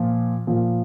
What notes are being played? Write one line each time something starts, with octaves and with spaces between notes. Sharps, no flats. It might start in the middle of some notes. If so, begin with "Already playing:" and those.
Already playing: A#2 F3
A#2 F3